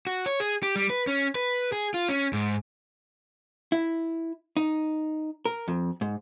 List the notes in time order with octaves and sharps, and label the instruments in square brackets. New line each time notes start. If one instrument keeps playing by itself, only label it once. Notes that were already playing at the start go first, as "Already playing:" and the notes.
[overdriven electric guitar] F#4
C#5
G#4
G4
G3
B4
C#4
B4
G#4
F4
C#4
G#2
[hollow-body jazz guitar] E4
D#4
A#4
F2
G#2